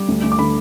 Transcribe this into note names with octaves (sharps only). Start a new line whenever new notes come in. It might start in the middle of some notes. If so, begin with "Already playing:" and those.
Already playing: G3 D6
D2
D2
D6
D3 B5